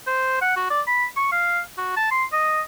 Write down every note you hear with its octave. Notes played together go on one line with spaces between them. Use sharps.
C5
F#5
F#4
D5
B5
C#6
F5
F#4
A5
C6
D#5